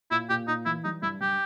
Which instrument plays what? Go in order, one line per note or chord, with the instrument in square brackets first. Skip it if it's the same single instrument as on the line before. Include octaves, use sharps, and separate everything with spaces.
[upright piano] A#2 [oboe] E4
[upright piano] A#2 [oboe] G4
[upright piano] A#2 [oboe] D#4
[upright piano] E3 [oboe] E4
[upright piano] G3 [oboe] D#4
[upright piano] G2 [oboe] E4
[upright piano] G2 [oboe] G4